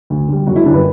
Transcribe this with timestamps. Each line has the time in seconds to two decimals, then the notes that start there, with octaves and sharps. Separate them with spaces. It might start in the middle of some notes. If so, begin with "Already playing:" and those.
0.10 D2
0.28 D3 G3
0.47 F#1 F#4
0.56 E4
0.65 F#2 D3 G3 D4
0.74 B4